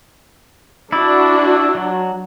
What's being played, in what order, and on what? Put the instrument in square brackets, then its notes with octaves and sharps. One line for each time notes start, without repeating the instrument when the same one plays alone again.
[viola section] D4 F#4 [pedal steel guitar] E4 D5
[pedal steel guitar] F#3